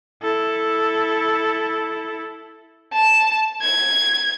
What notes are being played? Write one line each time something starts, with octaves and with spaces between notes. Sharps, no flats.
E4 A4
A5
G#6